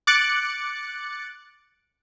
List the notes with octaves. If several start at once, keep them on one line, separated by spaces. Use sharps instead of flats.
D6 F#6 A6 C#7